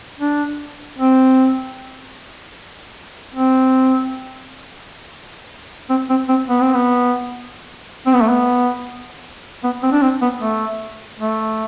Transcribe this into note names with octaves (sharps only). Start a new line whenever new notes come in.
D4
C4
C4
C4
C4
C4
B3
C4
B3
C4
B3
A3
B3
B3
C4
D4
C4
B3
A3
A3